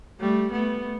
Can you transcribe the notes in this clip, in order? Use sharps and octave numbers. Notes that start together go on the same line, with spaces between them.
G3 A3
A3 B3